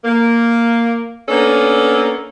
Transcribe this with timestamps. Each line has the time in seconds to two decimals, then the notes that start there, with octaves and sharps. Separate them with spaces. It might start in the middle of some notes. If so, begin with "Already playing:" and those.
0.05 A#3
1.29 A#3 B3 C#4 D4 A4